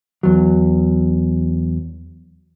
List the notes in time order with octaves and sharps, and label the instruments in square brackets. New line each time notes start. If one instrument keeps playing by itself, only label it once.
[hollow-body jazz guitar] E2 F#3